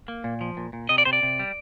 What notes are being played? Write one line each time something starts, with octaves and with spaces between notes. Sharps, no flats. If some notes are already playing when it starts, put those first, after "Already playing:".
A#3
A#2
F3
A#2
A#2
C3 D#5
D5
C3 C5
D5
C3
G3